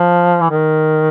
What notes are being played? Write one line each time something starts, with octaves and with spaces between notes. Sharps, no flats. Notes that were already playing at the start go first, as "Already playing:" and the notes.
Already playing: F3
E3
D#3